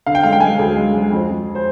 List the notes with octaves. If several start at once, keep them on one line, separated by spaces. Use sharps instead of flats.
D3 F5
G5
G#3 F5
G5
G#3 G#5
G5
D2 G#4
G#3
G#3
F2
F2
C5